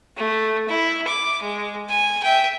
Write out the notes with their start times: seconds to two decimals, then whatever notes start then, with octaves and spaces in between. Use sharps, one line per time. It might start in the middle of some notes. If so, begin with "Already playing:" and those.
0.17 A3
0.68 E4
1.07 D6
1.42 G#3
1.90 G#5
2.23 E5 G5